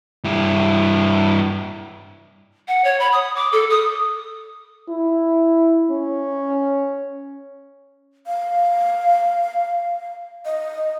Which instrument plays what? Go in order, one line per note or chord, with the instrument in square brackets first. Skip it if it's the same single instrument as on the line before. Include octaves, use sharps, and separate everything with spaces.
[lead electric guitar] G2 E4
[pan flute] F#5
C#5
B5
D#6
D6
A4
D#6
[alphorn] E4
C#4
[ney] F5
D#5